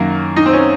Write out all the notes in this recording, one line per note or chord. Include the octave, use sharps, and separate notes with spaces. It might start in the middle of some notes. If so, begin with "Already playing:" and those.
Already playing: F#2 D#3 F#3 A#3
D#4
C4
C#4